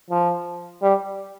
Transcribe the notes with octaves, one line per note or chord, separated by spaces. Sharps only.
F3
G3